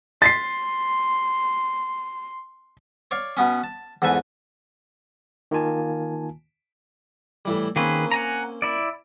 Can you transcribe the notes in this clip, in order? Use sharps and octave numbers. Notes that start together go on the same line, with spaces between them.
C6 A6 B6 C7
C#5 D5 F5
B2 B3 C#4
A5
E2 G#2 A4 B4 G#5
D#3 A#3 F4 G#5 A5
A2 E3 G3
D#3 A#3 C4 C#4 G#4 B4
F#5 G#5 A#5
E4 D5